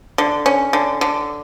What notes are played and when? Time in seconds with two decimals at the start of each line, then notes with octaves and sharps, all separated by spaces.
0.18 D3
0.46 C#4
0.73 D3
1.01 D3